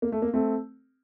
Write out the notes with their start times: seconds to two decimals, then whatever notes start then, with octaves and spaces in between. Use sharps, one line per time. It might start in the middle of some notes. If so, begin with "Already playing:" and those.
0.02 A#3
0.12 A3
0.22 A#3
0.33 A3 C4